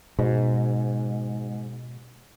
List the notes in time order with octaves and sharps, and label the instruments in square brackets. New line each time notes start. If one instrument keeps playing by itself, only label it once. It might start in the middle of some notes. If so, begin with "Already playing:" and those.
[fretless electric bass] G#2 [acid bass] B2